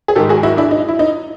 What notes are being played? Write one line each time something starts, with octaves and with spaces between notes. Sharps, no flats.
G#4
G#2 D#3 G4 A4
F#4 G#4
E4 F#4
D4 E4
D#4
E4
D#4